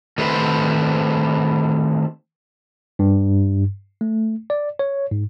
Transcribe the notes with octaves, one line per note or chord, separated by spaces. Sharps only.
D#3 A3 C4 B4 C5 E5
G2
A3
D5
C#5
G#2